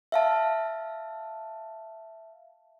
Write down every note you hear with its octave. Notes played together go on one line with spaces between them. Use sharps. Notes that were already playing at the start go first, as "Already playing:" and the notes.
E5 F5 A5